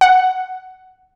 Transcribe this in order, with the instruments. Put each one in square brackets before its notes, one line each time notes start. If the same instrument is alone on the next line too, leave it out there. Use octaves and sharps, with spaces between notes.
[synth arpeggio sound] F#5